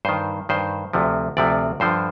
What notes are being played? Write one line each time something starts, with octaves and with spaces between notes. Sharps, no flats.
G2 D#3 C5
G2 D#3 C5
D2 C3 F3
D2 C3 F3 D5
G2 D3 F3 C5